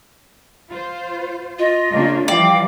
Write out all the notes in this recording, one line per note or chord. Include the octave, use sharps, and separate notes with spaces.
F4 C5
F4 D#5
C#3 A#3 D4
E3 F3 G3 D5 F5 G5